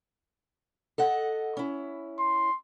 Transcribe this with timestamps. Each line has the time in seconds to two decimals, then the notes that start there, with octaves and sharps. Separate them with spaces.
0.98 A4 D#5 F#5
1.57 C#4 E4
2.19 C6